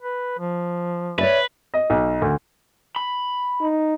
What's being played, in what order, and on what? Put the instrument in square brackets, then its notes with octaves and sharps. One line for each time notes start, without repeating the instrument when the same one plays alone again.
[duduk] B4
F3
[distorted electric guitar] B4 [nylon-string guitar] C#5 D5 E5
[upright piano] D#5
B1
D2
[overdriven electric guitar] B5
[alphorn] D#4